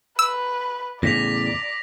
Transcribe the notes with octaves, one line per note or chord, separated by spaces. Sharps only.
B4 E6
E2 A2 C#3 D5 A#6 B6 F7